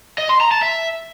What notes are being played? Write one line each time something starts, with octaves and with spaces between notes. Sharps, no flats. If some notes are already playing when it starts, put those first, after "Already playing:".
D#5
C6
A#5
A5
E5